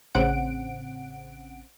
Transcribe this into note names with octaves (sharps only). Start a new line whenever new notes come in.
A1 C#3 C4 F#5 D7